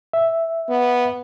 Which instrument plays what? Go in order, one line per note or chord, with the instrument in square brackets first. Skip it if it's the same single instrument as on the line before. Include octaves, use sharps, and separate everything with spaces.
[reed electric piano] E5
[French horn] B3